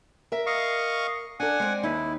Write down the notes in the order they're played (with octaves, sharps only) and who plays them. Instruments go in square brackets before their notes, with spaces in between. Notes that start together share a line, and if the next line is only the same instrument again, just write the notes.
[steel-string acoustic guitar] A#4 E5
[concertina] D#5 F5 C#6
[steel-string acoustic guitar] D4 A4 [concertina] F#5 G#5
[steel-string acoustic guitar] G#3 C4 D5
[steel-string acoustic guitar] D#2 D#4 [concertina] E4